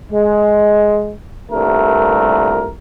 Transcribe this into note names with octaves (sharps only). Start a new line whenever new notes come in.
G#3
C2 G2 A#2 A3 A#4